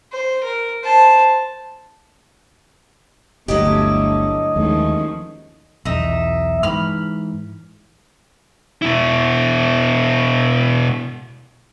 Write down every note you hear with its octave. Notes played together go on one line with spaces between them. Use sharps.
C5
A#4
C5 A5
G1 D2 D3 F#3 A3 E4 G4 D#5
D#2 D#3 F3 G#3 A3 C#4
B1 E2 D#4 E5
G#2 E3 B5 F6
B2 E4